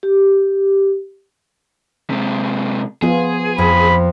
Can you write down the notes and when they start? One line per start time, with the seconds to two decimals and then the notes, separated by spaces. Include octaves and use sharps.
0.03 G4
2.10 C3 G#3
3.02 F3 B3 F4 G#4
3.58 F2 B5